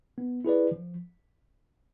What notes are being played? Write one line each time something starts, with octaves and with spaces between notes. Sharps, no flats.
B3
E4 G#4 B4 D5
F3